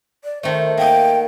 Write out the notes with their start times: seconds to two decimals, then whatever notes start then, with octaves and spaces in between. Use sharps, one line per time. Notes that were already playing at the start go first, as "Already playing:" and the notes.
0.24 D5
0.43 D#3 A3 C5
0.77 A#3 D#4 G5